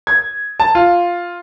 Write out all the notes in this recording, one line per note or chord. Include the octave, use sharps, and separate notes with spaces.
G#6
A5
F4